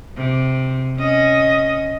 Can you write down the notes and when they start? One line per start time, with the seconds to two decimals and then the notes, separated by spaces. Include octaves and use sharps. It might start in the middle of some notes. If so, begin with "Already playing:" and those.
0.17 C3
0.97 C#4 D#5